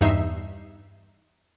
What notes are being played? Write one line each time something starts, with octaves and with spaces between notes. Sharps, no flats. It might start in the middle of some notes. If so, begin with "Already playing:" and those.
E2 G2 D#4 E5 C7